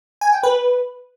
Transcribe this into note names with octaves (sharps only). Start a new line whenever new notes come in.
G#5
G5
B4